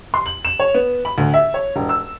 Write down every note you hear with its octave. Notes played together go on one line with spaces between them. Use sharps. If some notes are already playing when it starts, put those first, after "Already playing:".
C6
F#7
E7
C#5
B3
B5
D2
E5
C#5
E1
E6